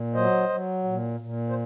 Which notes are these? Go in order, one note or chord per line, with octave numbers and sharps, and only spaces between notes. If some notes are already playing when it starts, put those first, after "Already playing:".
Already playing: A#2
F#3 C5 D#5
F#3
A#2
A#2
C5